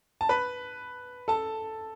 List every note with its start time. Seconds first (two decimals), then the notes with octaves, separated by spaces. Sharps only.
0.21 A5
0.29 B4 B5
1.28 A4 A5